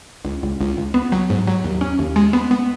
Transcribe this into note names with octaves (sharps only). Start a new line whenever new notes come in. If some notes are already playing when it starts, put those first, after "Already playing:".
C#2
C#2
C#2
C#2
B3
F#3
G#2
F#3
D#2
C#4
D#2
G#3
B3
B3